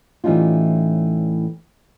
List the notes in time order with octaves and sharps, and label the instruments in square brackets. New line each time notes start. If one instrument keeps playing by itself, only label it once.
[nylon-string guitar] A2 E3 G3 C#4 D#4 F4